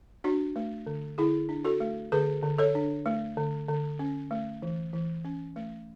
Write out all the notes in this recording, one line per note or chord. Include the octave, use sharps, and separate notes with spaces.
D4 F#4
A3
D3
D3 E4 G#4
D4
F#4 A4
A3
D3 G#4 B4
D3
A4 C#5
D4
A3
D3
D3
C#4
A3
E3
E3
C#4
A3